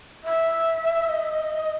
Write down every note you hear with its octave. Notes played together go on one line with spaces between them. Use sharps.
E5
D#5